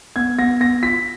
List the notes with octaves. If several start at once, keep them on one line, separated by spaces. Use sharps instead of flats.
B3 G#6
B3 A#6
B3 A#6
F4 B6